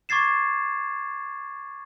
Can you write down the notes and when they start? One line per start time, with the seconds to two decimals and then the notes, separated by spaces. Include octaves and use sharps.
0.09 C#6 D6 G#6 A6 C7 E7